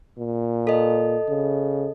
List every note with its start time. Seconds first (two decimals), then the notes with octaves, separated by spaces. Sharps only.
0.18 A#2
0.67 A4 D#5
1.28 C#3